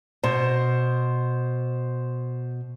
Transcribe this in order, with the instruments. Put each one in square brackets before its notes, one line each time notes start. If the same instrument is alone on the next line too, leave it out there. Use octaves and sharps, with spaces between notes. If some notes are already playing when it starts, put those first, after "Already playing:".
[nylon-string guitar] B2 [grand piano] C5